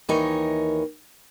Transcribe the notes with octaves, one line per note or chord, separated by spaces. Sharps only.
D#2 E3 D#4 A#4 C#5 G#5